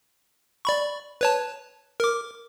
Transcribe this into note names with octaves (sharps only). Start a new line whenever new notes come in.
D5 B5 C#6
B4 C#5 A5
A#4 D6